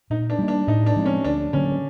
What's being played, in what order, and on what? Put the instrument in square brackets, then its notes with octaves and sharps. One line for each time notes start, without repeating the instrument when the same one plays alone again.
[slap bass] A#2 [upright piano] D#4
[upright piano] D4
[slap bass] G3 A#3
[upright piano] D4
[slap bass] A2 [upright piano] D#4
[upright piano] D4
[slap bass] F3 G#3 C4
[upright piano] C#4
[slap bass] D2 [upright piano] D4
[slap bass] D3 F#3 A#3 [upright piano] C#4